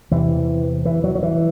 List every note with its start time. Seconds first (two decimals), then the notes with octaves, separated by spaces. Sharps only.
0.11 E2 C3 E3
0.85 E3
1.04 F#3
1.15 F#3
1.23 E3